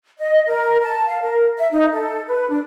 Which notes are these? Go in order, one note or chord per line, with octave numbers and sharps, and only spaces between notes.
D#5
A#4
A5
F5
A#4
E5
D#4
A4
B4
D4